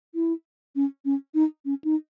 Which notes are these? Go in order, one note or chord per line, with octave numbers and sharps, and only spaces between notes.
E4
C#4
C#4
D#4
C#4
D#4